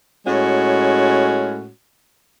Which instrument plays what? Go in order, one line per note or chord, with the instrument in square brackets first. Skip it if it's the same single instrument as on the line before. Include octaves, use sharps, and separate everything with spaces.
[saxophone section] A2 G#3 C#4 F#4